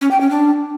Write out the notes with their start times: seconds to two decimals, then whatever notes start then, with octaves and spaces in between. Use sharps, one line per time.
0.01 C#4
0.11 G5
0.21 C#4
0.30 D4